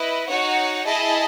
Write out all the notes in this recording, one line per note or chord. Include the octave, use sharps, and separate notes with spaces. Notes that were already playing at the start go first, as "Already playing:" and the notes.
Already playing: E4 B4 D#5
D#4 F#4 C#5 F#5
E4 G#4 D#5 A5